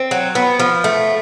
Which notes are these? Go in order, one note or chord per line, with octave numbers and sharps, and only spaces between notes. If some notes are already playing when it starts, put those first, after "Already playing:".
Already playing: C4
F#3
B3
F3
A3